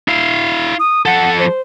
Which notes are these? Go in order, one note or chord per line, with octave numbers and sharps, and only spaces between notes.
E4 F5
D#6
F3 A4 F#5
C5